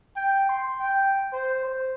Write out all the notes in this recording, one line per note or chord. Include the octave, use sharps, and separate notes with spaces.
G5
C6
G5
C5
C5